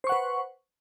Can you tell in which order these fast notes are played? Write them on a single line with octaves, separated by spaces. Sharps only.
C5 C#6 F#5 B4